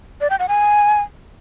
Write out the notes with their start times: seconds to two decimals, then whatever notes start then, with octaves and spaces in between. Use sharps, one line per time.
0.21 D5
0.30 G5
0.39 F#5
0.49 G#5